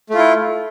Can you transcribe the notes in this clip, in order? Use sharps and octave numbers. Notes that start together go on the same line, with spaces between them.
A3 E4 F4